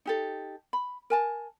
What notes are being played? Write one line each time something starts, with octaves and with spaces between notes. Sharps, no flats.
D#4 G4 A4
B5
A#4 G#5 A5